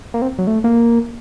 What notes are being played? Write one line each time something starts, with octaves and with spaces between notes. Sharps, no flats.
A#3
C4
F#3
A3
A#3